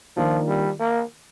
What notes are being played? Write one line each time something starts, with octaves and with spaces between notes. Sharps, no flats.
D#3 F3 A#3 D4 F4
G3
A#3